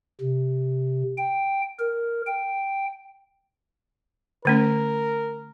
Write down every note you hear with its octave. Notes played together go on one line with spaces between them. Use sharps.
C3
G5
A#4
G5
D3 A3 C#4 A#4